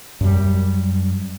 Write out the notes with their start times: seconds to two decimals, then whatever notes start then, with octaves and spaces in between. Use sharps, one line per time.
0.21 F#2 G3